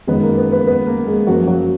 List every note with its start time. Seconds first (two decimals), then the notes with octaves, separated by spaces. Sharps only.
0.07 F#2 D#3 G#3 B3 B4
0.23 A#3 A#4
0.37 B3 B4
0.52 B3 B4
0.67 B3 B4
0.87 A#3 A#4
1.07 G#3 G#4
1.27 F#2 F3 F#3 A#3 F#4
1.47 F#3 F#4